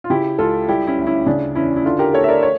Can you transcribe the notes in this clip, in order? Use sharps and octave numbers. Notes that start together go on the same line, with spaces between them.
F4
C#3 E4 G4
C#2 F4 A4
G3 E4 G4
C#4 E4
D2
C#4 E4
C#3 D4
E2 C#4 E4
E4
D3 D4 F4
G4 A#4
A3 A4 C#5
E5
A#4 D5
C#5